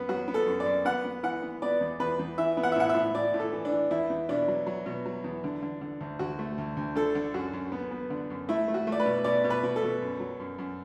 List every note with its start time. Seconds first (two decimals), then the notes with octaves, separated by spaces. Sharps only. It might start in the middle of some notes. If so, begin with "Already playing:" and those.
Already playing: F#2 B3
0.09 F#3 F#4
0.28 B3
0.34 A4
0.47 F#2
0.60 D5
0.66 F#2
0.85 B3 F#5
1.04 B3
1.23 E3 F#5
1.42 B3
1.62 B3 D5
1.81 E2
2.00 E2 B4
2.19 E2
2.38 E3 E5
2.57 B3
2.63 F#5
2.72 E5
2.76 A2 F#5
2.89 E5
2.95 A2
3.14 A2 D5
3.34 A2
3.40 A4
3.52 E3
3.65 D4
3.72 E3
3.91 E2 E4
4.10 E2
4.29 B2 D4
4.48 F#3
4.67 F#3
4.86 B2
5.06 F#3
5.24 E2
5.44 D3
5.62 D3
5.81 D3
6.01 D2
6.19 D2 F#4
6.39 A3
6.58 D2
6.77 D2
6.95 D3 A4
7.15 D3
7.34 F#2 F#4
7.53 F#2
7.72 B3
7.91 B3
8.10 D3
8.30 F#2
8.49 A3 E4
8.68 A3
8.74 F#4
8.87 A3
8.92 D5
9.00 B4
9.05 B2
9.24 B2 D5
9.44 B2
9.50 B4
9.63 B2
9.76 A4
9.83 B2
10.02 F#2
10.20 F#3
10.40 F#2
10.58 F#2